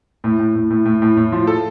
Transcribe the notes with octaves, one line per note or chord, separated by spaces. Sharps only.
A2
A2
A2
A2
A2
A2
A2
F3
A4